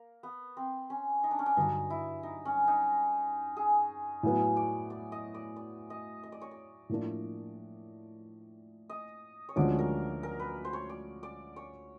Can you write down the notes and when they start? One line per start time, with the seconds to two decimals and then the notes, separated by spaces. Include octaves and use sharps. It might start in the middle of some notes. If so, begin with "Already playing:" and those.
Already playing: A#3
0.23 B3
0.57 C4
0.90 C#4
1.24 D#4
1.31 D4
1.39 C#4
1.46 D4
1.57 G2 D3 F#3 D#4
1.90 E4
2.23 D#4
2.45 C#4
2.68 D#4
3.57 G#4
4.23 A2 F#3 B3
4.57 D5
4.90 D5
5.12 D#5
5.34 D5
5.56 D5
5.90 D#5
6.23 D#5
6.32 D5
6.41 C#5
6.51 D5
6.89 A2 F3 A#3 D4
8.90 D#5
9.49 C#5
9.56 D2 D3 F3 G#3 C#4 D5
9.79 A#4
10.23 A#4
10.40 B4
10.65 C5
10.73 C#5
10.89 D5
11.23 D5
11.56 C#5